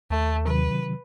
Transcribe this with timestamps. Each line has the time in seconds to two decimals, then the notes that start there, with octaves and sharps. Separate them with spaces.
0.10 D#2 A3
0.46 C3 D#3 F#3 B4